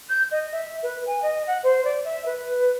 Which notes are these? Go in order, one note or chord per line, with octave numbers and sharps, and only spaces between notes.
G6
D#5
E5
B4
G#5
D#5
F#5
C5
D5
E5
B4